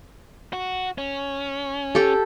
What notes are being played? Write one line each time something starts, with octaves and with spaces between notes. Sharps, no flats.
F#4
C#4
G4 A4